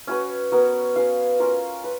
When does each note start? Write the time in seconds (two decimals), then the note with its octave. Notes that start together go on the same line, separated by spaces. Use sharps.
0.07 C#4 F#4 B4
0.52 B3 F#4 A#4
0.96 C#4 F#4 B4 F5
1.40 C#4 F4 A#4
1.84 B4